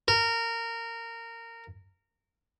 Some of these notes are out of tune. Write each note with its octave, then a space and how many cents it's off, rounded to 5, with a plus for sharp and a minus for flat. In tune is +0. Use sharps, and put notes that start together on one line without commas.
A#4 -20